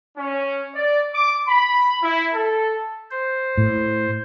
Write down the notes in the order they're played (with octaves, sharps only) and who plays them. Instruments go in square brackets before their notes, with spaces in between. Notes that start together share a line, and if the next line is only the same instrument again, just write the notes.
[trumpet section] C#4
D5
D6
B5
E4
A4
[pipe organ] C5
[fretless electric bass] A2